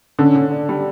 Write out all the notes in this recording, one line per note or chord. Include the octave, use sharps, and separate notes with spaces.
D3 C#4
D3
D4
G3